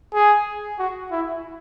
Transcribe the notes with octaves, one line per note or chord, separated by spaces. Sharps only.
G#4
F#4
E4